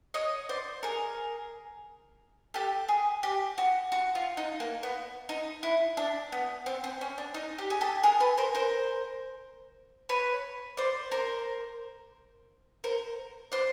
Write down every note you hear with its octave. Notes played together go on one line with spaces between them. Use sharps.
C#5 D#5
C5 D5
G#4 A#4
G4 A4
G#4
G4
F#4
F#4
F4
D#4
A#3
B3
D#4
E4
D4
B3
C4
C4
C#4
D4
D#4
G4
G#4
G4 A4
G#4 A#4
A4 B4
A#4 C5
A#4 C5
B4 C#5
C5 D5
A#4 C5
A#4 C5
C5 D5